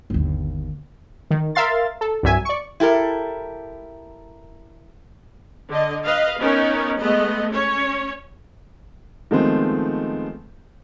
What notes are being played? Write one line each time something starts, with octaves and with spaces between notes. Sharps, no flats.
G1 D#2
D#3
A#4 E5 F5 C6 A6
A4
C2 G2 F#3 E5 G#5
D5 C#6
E4 G4 A4 A#4
D3 D#5
B4 D#5 F5
B3 C#4 D#4 A#4
G#3 A3 B3 D#5
C#4 C#5
D#3 F3 G#3 A3 B3 C4